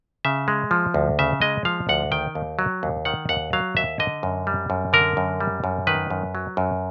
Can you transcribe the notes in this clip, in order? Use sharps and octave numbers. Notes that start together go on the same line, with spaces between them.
C#3 E5
G#3
F3
D2
C#3 E5
G#3 D#5
F3 F5
D2 F#5
D#3 G5
D#2
F#3
D#2
D#3 F#5
D#2 F#5
F#3 F5
D#2 E5
D3 D#5
F#2
G3
F#2
D3 A#4
F#2
G3
F#2
D#3 B4
F#2
F#3
F#2